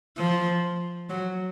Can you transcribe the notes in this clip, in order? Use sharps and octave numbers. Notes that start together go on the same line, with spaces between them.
F3
F#3